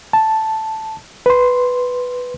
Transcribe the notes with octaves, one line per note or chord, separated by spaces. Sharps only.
A5
B4 C6